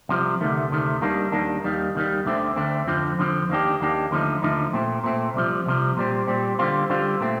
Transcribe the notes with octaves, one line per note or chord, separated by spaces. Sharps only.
C2 C3 F3
D2 C3 D#3 A3
D2 C3 D#3 A3
D#2 D#3 G3 A#3 D4
D#2 D#3 G3 A#3 D4
D#2 D#3 G3
D#2 D#3 G3
D2 D3 A3 C4
D2 D3 A3 C4
F2 D3 F3 C4
F2 D3 F3 C4
D#2 D#3 A#3 D4 G4
D#2 D#3 A#3 D4 G4
D#2 D3 F3 A3 D#4
D#2 D3 F3 A3 D#4
A#2 A3 C4
A#2 A3 C4
C2 C3 F3
C2 C3 F3
A#2 G3 C4
A#2 G3 C4
D3 G3 C4 F4
D3 G3 C4 F4
A#2 A3 C4